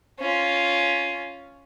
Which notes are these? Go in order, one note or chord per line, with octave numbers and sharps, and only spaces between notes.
C#4 F4